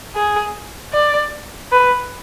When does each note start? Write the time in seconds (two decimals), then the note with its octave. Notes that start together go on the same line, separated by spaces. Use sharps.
0.15 G#4
0.93 D5
1.72 B4